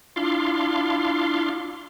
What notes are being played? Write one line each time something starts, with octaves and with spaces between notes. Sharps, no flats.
D4 E4 F4 F5 C6 D6